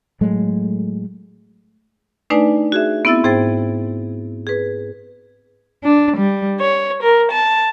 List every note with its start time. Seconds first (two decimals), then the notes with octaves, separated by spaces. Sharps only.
0.21 A2 F#3 G#3 A3
2.30 A3 D4 D#4 B4 D5 G#5
2.72 F#4 G#4 E5
3.05 B3 C4 E4 E5 E6 A6
3.24 G#2 G#4 C5 G5 A6
4.47 G#4 B4
5.84 D4
6.19 G3
6.61 C#5
7.02 A#4
7.32 A5